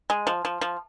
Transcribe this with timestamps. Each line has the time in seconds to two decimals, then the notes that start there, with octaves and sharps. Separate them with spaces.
0.10 G#3
0.27 F3
0.45 F3
0.61 F3